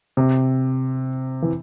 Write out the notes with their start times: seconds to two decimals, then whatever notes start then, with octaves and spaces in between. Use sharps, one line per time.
0.17 C3
1.42 E3